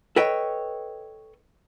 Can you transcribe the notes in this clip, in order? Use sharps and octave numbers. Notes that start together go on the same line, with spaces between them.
A4 B4 C#5 D#5 G5